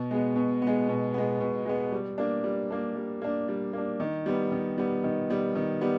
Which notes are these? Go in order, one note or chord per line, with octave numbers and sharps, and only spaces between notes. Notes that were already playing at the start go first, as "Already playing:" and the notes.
Already playing: B2
G#3 B3
B2
G#3 B3
B2
G#3 B3
B2
G#3 B3
G3
A#3 D4
G3
A#3 D4
G3
A#3 D4
G3
A#3 D4
D#3
G3 B3
D#3
G3 B3
D#3
G3 B3
D#3
G3 B3